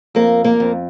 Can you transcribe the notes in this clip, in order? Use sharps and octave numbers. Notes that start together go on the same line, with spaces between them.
F2 A#3 A#4
A#3 A#4
F2